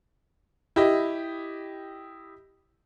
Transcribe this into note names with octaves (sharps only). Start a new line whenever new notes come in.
E4 G4 D#5